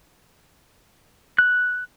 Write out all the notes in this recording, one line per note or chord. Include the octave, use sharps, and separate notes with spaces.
F#6